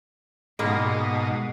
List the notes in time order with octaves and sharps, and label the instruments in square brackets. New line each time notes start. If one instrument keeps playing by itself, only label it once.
[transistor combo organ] G#2 D#5 [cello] B2 [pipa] G3 G#3 A#3